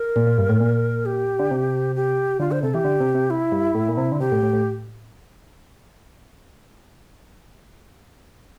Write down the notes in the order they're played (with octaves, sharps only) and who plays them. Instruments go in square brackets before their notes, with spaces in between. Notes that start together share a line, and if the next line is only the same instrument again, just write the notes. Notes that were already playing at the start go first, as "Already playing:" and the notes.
Already playing: [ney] A#4
[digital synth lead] A#2
A#2
G2
A2
A#2
[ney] G4
[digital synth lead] D3
C3
[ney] G4
[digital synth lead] D3 [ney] F4
[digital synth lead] D3 [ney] C5
[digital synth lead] C3 [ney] A4
[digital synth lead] E3 [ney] G4
[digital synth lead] D3
C3
C3
[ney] E4
[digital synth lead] G2
A2
A#2
C3
D3
[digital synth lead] C3 [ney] G4
[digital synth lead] A2
A2
A2